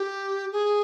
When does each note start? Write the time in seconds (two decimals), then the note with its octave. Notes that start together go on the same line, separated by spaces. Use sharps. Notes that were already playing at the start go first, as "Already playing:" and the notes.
Already playing: G4
0.52 G#4